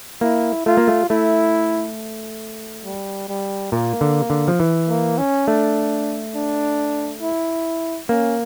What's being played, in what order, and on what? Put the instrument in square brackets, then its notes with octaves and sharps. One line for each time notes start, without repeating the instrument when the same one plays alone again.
[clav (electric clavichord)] A#3 [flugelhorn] E4
[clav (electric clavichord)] A3 [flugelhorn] F4
[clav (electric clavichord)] A#3
A3
[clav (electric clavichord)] A3 [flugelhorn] E4
[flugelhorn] G3
G3
[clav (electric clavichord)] A#2 [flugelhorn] A#3
[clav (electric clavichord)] D3
D3
F3
E3
[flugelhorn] A#3
C#4
[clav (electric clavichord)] A3 [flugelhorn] D4
[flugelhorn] D4
E4
[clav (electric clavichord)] A#3 [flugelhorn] C#4